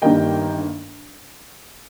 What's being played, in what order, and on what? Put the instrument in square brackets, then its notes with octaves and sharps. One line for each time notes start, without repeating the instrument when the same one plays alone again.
[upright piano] G1 G2 D#3 G3 A#3 D#5 G5